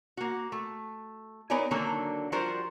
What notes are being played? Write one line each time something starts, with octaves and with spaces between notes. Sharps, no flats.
A#3 F#4
A3
B3 D#4 A#4 C#5 D5 G#5
D3 D#3 F#3 A#3 D4 A4
F3 G3 F4 F#4 A#4 C5